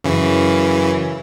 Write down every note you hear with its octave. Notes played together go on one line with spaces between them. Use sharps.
F#2 C#3 E3